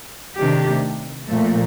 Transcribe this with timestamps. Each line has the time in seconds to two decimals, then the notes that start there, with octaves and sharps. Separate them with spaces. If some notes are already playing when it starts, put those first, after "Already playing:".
0.38 C3 D#3 A3 D4 G4
1.28 A#2 F3 A3